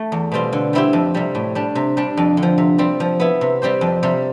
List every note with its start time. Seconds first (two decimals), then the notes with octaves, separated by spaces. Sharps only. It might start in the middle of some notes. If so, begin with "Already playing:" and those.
Already playing: A3
0.12 E2
0.32 B2 G3 C4 F4
0.53 D3
0.73 G3 C4 E4 G4
0.93 F2
1.14 C3 G3
1.35 A2
1.55 G3 D4
1.75 C3
1.97 G3 D4
2.17 F2
2.37 D3
2.43 F3
2.58 C3
2.78 G3 C4
3.00 F3
3.20 B3 E4
3.41 C3
3.62 G3 C4 G4 C5
3.81 F2
4.03 C3 G3